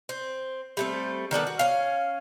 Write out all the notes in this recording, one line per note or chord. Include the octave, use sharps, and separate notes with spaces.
C4
G3 A3 C4
D#3 G3 B3 A4
F#4
C#4 F5